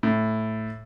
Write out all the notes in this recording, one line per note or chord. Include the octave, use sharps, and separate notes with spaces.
A2